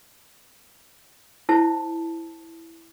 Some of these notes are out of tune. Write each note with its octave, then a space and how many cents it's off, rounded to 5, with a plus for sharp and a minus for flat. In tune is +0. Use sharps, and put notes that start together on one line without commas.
E4 +0 C5 +0 A5 +0